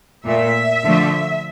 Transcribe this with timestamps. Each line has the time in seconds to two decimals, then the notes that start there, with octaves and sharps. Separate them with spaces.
0.25 A#2 A3 E5
0.84 D3 F3 A3